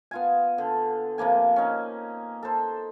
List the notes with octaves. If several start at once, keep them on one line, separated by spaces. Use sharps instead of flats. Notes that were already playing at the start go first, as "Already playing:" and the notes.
B3 F4 G#5
D3
C3 F3 A#3 G#5
C#4 D#4
A4 C5